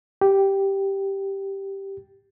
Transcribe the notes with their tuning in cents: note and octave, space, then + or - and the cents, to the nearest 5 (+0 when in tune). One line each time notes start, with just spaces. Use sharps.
G4 -5